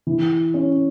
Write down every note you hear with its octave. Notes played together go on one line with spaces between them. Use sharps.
E3
C#4